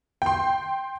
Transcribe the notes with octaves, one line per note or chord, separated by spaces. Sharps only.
G5 C6